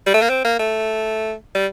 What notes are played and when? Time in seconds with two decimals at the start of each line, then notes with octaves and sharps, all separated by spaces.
0.06 G3
0.14 A3
0.21 A#3
0.30 C4
0.44 A#3
0.59 A3
1.55 G3